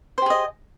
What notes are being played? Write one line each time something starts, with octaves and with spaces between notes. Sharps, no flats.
G4 G#4 C5 D#5